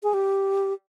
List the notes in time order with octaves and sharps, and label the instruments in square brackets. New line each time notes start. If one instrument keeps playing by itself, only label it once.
[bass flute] G#4
G4